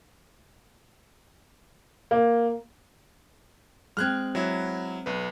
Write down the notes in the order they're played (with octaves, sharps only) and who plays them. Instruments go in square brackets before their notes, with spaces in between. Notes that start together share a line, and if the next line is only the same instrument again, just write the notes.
[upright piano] A#3
[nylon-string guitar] G#3 C4 [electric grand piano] F6 F#6 G#6
[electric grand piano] F#3 E4
B1 B4